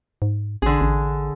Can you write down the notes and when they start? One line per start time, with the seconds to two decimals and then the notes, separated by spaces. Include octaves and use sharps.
0.22 G#2
0.62 A1 D3 G#4
0.81 A1